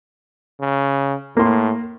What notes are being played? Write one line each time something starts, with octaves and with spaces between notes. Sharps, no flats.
C#3
A2 A#3 C6